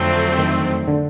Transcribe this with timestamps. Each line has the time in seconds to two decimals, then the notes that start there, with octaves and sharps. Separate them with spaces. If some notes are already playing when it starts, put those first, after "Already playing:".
Already playing: F2 D3 F3 F#3 A3 C4
0.38 D#3
0.88 D3